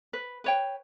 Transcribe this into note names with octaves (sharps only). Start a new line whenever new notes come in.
B4
B4 C#5 G5